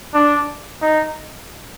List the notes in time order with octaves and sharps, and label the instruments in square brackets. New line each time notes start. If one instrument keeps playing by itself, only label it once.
[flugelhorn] D4
D#4